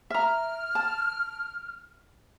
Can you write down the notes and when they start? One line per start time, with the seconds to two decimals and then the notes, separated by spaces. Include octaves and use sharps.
0.10 E5 A#5 F6
0.75 A5